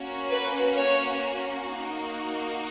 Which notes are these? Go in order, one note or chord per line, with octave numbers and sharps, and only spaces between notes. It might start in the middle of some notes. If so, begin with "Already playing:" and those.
Already playing: A#3 C#4 F#4
B4
C#5
A#3 D#4 F#4